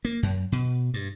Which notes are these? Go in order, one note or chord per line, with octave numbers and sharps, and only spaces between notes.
A#3
F#2
B2
G2